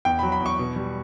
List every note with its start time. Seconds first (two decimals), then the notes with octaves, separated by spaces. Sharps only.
0.05 E2 G5
0.19 F#3 B5
0.32 B5
0.40 E2
0.46 C#6
0.59 B2
0.76 G3